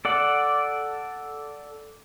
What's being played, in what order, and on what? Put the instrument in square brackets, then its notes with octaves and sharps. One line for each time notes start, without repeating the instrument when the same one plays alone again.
[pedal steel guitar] A4 D5 F#5